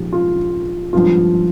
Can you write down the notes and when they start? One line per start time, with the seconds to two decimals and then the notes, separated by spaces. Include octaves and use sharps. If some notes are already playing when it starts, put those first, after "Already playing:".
Already playing: A#1 G#2 F3 G4
0.13 F4
0.93 G#1 G2 F3 F4